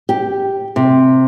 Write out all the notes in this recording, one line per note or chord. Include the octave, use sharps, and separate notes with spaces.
G4
C3